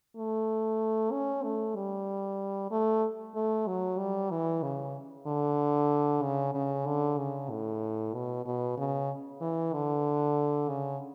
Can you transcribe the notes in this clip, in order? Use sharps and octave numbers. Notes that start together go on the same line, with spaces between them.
A3
C#4
A3
G3
A3
A3
F#3
G3
E3
C#3
D3
C#3
C#3
D3
C#3
A2
B2
B2
C#3
E3
D3
C#3